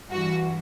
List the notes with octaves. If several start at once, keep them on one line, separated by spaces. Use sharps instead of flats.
G2 E3 F#4